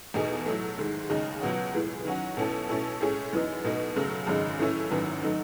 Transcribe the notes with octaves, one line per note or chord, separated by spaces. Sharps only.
E2 B2 A3 D#4 G#4
A2 F#3 A3
G#2 D#3 G#3
D#2 C#3 G#3 D#4
C#2 B2 F#3 B3 F#4
A2 E3 G#3 B3
D#3 F#3 C#4 F#4
B2 A3 C#4 E4 A4
B2 A3 C#4 E4 A4
A2 G#3 C#4 G#4
F#2 E3 B3 D#4
B2 A3 D#4
F#2 C#3 F#3 A3
G#1 F#2 C#3 G#3 D#4
A2 E3 A3 C#4 E4
G#1 F#2 D#3 F#3 B3
D#3 F#3 A3 D#4